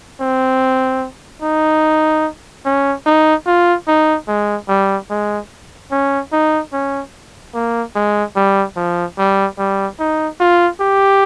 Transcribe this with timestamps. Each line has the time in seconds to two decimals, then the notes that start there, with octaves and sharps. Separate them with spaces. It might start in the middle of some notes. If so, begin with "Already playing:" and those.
0.20 C4
1.42 D#4
2.65 C#4
3.06 D#4
3.47 F4
3.88 D#4
4.28 G#3
4.68 G3
5.10 G#3
5.91 C#4
6.32 D#4
6.73 C#4
7.54 A#3
7.95 G#3
8.36 G3
8.76 F3
9.18 G3
9.58 G3
9.99 D#4
10.40 F4
10.81 G4